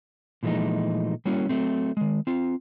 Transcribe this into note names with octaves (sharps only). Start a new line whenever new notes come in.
A#2 E3 F3 G#3 A3 D#4
G3 A#3 C#4 E4 F#4
F#3 A3 C4
D#3 G#3
C4 F4